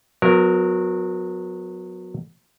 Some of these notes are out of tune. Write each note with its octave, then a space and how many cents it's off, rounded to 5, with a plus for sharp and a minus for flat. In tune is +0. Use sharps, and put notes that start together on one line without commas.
F#3 -25 B3 +15 A#4 +0